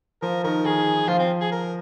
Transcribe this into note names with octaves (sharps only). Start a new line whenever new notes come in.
F3 A#4
D#3 A#4
D#3 G#4
F3 F4
C4
G#4
A#4